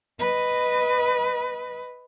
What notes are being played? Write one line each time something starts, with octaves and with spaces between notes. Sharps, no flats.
B4 D#5